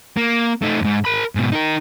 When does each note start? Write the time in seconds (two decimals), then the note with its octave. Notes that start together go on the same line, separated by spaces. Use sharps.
0.17 A#3
0.62 A3 D#4
0.81 F2 G#2
1.05 A#4 B5
1.35 G#2 B2
1.52 D#4 A#4